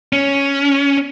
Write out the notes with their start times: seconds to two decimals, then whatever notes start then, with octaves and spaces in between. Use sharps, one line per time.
0.13 C#4